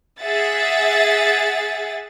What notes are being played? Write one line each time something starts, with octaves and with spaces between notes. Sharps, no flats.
G#4 E5 F#5 A6